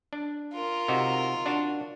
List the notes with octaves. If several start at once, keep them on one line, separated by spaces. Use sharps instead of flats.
D4
F4 A#4
C3 D#4 F#4
D4 F#4